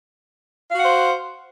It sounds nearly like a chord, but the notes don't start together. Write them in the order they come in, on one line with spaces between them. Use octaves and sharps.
F5 F#4 F#5 C5